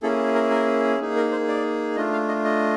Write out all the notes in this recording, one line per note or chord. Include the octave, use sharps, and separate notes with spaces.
A#3 C#4 E4 G#4 A4
A#4
A#4
A#3 D#4 G#4
A#4
C5
D5
A3 D4 F4 D#5
F5
D#5
D#5